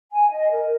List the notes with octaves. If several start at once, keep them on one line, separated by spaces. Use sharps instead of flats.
G#5
D#5
A#4